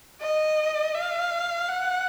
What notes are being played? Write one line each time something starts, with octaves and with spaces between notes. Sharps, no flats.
D#5
F5
F#5